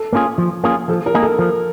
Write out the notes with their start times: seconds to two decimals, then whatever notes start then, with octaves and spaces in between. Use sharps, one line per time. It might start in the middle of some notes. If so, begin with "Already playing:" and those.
Already playing: A4
0.13 A#3 C#4 F4 G#4
0.38 F3
0.64 A#3 C#4 F4 G#4
0.89 F3 A4
1.06 A#4
1.14 A#3 D#4 G#4
1.22 A4
1.39 F3